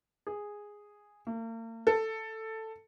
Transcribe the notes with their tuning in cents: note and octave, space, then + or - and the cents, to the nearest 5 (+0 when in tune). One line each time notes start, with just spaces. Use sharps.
G#4 -5
A#3 -45
A4 +10